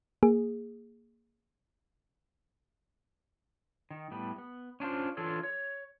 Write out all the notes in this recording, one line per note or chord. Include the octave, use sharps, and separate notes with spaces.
A#3 G#4
D#3
A2 G3 B3
B3
C#4 D4 F4 C5
E3 D4 F4 A4 C#5
C#5